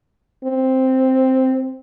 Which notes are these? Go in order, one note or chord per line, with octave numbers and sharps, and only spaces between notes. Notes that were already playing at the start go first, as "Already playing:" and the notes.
C4